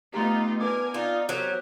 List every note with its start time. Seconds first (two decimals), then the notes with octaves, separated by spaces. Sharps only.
0.14 A3 B3 D#4 F4 G4 A#5
0.61 B3 D4 A#4 B4 G#5 D6
0.94 D#4 F4 D5
1.29 F#3 G4 A#4 C5